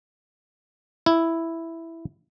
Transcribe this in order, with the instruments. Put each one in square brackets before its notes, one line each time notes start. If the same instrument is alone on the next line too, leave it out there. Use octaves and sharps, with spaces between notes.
[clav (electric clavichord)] E4